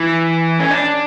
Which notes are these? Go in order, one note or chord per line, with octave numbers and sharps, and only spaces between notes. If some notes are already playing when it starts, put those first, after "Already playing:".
Already playing: E3
C#4
D4